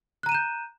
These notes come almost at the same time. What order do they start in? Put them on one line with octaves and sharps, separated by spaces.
F#6 A#5 D#7 E7 G6